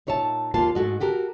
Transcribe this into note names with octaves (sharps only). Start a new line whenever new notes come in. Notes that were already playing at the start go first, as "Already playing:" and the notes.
A#2 D#4 C#5 E5 A5
D#2 A#3 F4 F5 A5
G#2 A3 F#4 D#5
F#4 G4 A4 A#4